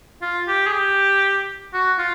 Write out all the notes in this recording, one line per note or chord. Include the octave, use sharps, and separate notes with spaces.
F4
G4
G#4
G4
F#4
F4